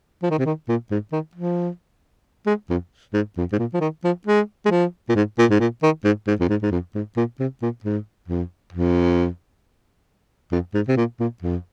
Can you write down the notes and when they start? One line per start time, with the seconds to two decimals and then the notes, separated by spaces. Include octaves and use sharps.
0.23 F3
0.30 D#3
0.39 C3
0.45 D#3
0.69 A#2
0.91 G#2
1.12 D#3
1.35 F3
2.46 G#3
2.70 F2
3.13 G#2
3.37 F2
3.52 G#2
3.59 A#2
3.73 F3
3.81 D#3
4.04 F3
4.26 G#3
4.65 G#3
4.71 F3
5.09 A#2
5.15 G#2
5.38 A#2
5.50 G#2
5.60 A#2
5.83 D#3
6.04 G#2
6.27 G#2
6.40 F2
6.49 G#2
6.62 G#2
6.71 F2
6.95 G#2
7.17 A#2
7.39 C3
7.62 A#2
7.84 G#2
8.28 F2
8.73 F2
10.52 F2
10.74 G#2
10.88 C3
10.97 A#2
11.20 A#2
11.42 F2